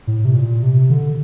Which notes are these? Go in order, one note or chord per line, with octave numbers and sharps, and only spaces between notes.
A2
C3
A#2
C3
D3